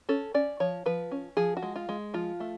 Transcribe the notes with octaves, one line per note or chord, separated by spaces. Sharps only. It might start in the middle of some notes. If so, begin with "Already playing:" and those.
C#4 A4
C#4 D5
F3 C#5
F3 B4
C#4
F3 G#4
F#4
G#3
F4
G#3
F3 F4
A3